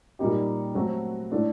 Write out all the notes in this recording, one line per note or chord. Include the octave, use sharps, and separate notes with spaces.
A#2 G3 A#3 D#4 G4
F#3 A3 C4 F#4
A2 A3 D4